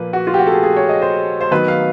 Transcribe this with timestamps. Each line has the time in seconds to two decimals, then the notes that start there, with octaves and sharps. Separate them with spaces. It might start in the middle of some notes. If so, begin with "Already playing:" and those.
Already playing: A#2 F3 A#3 B4
0.13 F#4
0.27 F4
0.34 G4
0.38 F#4
0.47 A4
0.52 G#4
0.63 G#4
0.77 C#5
0.89 D#5
1.02 C5
1.41 C5
1.51 D#3 F#3 B3 D#4 B4
1.68 F5